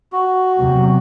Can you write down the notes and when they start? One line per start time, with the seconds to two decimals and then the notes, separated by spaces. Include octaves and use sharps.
0.13 F#4
0.60 E2 C3 F#3